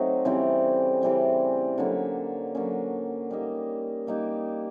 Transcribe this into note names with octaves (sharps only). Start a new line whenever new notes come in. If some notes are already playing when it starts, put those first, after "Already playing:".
Already playing: F#3 A3 C4 D#4
C#3 E3 G3 C4
C#3 E3 G3 C4
D3 F#3 A#3 C#4
D3 F#3 A#3 C#4
G3 A#3 D#4
G3 A#3 D#4